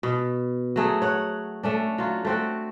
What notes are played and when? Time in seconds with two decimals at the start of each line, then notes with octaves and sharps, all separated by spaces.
0.03 B2
0.76 F#3 A3 G#4
1.02 C#5 F#5
1.63 A3 C#4 D4
1.98 F#3 F4
2.25 A3 C4 F#4